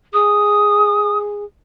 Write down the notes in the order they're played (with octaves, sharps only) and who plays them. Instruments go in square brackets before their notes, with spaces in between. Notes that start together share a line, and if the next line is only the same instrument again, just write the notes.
[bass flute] G#4 [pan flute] D#6